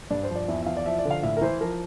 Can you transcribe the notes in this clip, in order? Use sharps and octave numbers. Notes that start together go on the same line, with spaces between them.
G2 D4
C5
F3
D5
E2 E5
E5
E3 F5
D5
F3 E5
D5
D3
F5
A2 E5
A#4
E3 C5
F3 A#4